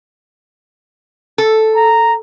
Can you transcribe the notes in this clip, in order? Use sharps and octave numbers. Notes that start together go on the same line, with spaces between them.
A4
A#5